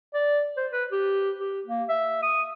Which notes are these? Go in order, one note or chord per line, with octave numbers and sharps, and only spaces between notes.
D5
C5
B4
G4
G4
A#3
E5
D#6